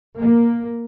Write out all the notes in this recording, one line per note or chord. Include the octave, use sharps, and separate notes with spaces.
A#3